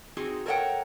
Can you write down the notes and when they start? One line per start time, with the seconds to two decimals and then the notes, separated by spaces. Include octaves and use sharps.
0.17 C4 D#4 F#4 G#4
0.46 A4 A#4 C#5 D5 F#5 G5